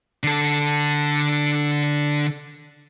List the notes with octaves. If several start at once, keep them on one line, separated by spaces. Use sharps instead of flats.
D3 A4